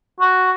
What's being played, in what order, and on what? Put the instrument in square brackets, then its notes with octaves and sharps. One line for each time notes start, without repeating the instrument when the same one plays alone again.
[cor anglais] F#4